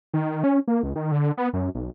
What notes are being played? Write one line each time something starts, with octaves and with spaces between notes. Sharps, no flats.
D#3
C#4
A#3
C#2
D#3
D3
B3
F#2
B1